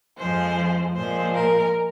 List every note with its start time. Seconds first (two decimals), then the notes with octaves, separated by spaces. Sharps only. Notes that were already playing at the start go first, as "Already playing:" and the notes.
0.17 F2 F3 G#3 C5
0.95 A#2 F3 G#3 C5
1.35 A#4